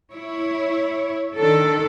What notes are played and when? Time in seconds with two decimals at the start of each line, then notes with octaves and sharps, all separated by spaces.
0.12 E4 C#5
1.36 D#3 D4 A4